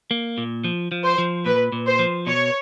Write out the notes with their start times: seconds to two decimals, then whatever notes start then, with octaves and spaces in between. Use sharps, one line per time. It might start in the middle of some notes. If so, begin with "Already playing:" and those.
0.11 A#3
0.38 A#2
0.64 F3
0.92 F3
1.04 C5
1.18 F3
1.45 A#2 B4
1.72 A#2
1.86 C5
1.99 F3
2.26 B2 C#5